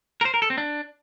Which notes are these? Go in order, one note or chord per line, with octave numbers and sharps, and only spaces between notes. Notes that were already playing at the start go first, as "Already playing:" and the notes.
A#4
C5
A#4
A4
C4
D4